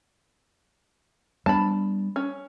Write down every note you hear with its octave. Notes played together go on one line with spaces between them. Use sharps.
G3 B3 D4 A5 B5
C#4